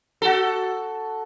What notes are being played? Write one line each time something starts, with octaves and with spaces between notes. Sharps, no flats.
F#4 A4